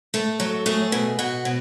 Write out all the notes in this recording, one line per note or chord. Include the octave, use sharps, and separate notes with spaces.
A3 A4
F#3
A3 G#4
B2
B2 F#4
B2